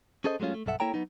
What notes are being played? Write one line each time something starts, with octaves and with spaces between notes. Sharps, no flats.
C#4 G#4 A4 C5 D#5
F#3 G#3 A3 C#4 F4
A3
B1 G2 A4 E5 F#5
A#3 E4 A4 C#5 G5 A#5
F#3 B3 D#4